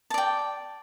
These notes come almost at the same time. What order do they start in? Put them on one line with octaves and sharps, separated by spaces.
A5 D5 G5